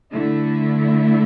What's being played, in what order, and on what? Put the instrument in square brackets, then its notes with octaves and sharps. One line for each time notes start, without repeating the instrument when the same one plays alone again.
[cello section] D3 A3 E4